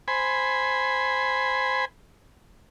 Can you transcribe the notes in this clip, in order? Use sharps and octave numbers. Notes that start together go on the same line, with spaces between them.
C5 G#5 B5